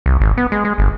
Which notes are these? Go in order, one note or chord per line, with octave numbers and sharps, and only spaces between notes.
C2
G#1
B3
G#3
G#3
G1